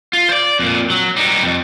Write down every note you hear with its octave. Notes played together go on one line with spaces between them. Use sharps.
F4
C5 D5
F2 A#2
F#3
G3 D#4
F2